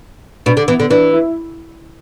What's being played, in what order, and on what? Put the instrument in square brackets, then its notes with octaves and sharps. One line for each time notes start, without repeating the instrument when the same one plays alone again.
[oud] B2 [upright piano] D4
[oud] D3
[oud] E3 [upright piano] B3
[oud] D3
[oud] E3 [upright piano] D4
[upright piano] E4